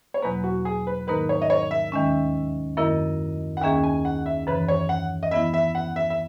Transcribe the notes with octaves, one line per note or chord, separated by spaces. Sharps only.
C#5
E2 B2 F#3 A#3 B4
F#4
G#4
B4
G#2 D#3 A#3 D#4 A#4 B4
C#5
D#5
C#5
E5
D#2 D#3 G#3 C#4
F#2 D#3 A#3 E4 A#4 D#5
F#5
D#2 D#3 A#3 C#4 G#4 E5
G#5
F#5
E5
F#2 C#3 E3 B4
C#5
F#5
D#5
E3 B3 E4 E5
E5
F#5
E5
E5